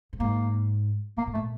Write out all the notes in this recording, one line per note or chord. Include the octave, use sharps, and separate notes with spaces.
A2
G#2 A#3
A#2 A#3
A2
A#2 A3